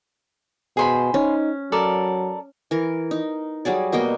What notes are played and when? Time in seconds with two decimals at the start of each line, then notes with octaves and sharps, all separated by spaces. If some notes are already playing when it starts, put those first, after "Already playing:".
0.77 B2 G#4 C5 B5
1.14 C#4 D#4
1.72 F#3 A4 A#4 D5
2.71 E3 A#4
3.11 D#4
3.65 F#3 G3 G#4 D5
3.92 B2 A#3 D#5 G5